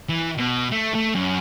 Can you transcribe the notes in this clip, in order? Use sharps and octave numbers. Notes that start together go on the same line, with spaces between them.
E3
B2
A3
A3
F#2